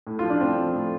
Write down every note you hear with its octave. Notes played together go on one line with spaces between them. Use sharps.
A2
F3 F4
D4
A2 C4
F3
A2